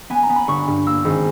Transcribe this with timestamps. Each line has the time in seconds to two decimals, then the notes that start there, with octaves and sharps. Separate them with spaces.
0.10 B3 G#5
0.23 A#5
0.30 B3
0.36 B5
0.48 G1 C#6
0.68 G2
0.86 A#3 E6
1.05 G#1